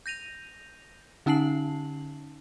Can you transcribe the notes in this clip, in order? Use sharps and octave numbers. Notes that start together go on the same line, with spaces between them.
G6 A#6 D#7 F7
D3 C#4 D#4 A5 C7 F#7